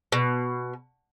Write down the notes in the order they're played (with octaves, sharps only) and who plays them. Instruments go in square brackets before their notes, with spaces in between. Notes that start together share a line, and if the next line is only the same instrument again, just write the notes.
[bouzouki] B2